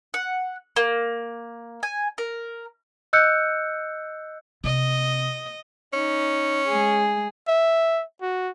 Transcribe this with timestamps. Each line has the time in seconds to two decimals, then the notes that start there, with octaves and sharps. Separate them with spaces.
0.14 F#5
0.76 A#3
1.83 G#5
2.18 A#4
3.13 D#5 E6 F#6 G6 C#7
4.64 C3 D#5
5.93 C#4 D#4
6.68 G#3 G#4
7.48 E5
8.21 F#4